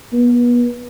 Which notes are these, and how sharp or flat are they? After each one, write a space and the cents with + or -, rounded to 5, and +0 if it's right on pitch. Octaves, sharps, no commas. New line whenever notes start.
B3 -30